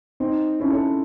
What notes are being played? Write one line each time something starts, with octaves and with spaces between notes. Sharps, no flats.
C4 D#4
C#4 E4
A4 C#5